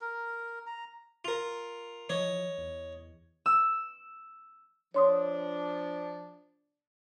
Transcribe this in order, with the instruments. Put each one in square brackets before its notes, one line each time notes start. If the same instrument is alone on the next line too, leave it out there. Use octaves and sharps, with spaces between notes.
[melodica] A#4
A#5
[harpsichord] F4 A#4
[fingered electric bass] E3 F3 [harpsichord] C#5 D#5
[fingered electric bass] E2
[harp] E6
[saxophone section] F3 D4 [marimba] C#5 C6 D#6